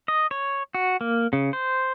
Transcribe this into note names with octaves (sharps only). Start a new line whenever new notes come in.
D#5
C#5
F#4
A#3
C#3
C5